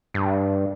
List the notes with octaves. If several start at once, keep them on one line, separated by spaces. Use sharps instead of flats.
G2